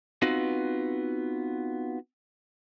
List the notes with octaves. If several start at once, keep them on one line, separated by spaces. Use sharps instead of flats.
B3 C4 D#4 F4 F#4 B4